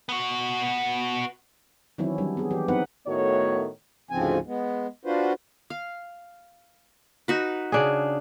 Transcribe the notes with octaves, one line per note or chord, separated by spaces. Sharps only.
B3 F#4
D#3 E3 F#3 C4 C#4 E4
F#3 G3 D4
B3 G#4
E3 G4
F#3 B3 C4 D#4 B4 F#5
A2 D#3 A3 B3 F#4 C#5
D2 G#2 C#3 F3 C4 G#5
G#3 B3
D4 F4 F#4 B4 C5
F5
D#4 F#4 B4
C#3 D4 G#4